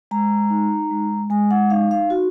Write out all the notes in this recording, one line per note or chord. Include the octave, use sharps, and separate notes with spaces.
G#3 A#5
D#4
G#3
G#3 G#5
F#5
D#4 F5
F5
F#4